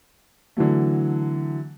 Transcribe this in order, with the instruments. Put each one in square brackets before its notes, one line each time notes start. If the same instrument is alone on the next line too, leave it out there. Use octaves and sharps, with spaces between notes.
[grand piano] D3 E3 F#3 A3